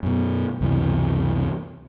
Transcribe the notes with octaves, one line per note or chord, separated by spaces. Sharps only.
F#2 B2
C#2 F#2 C3 E3